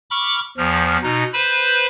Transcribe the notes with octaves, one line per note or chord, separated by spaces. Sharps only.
B5 C#6 D6 F6
E2 F3 F6
B2 D#4
B4 C5 B5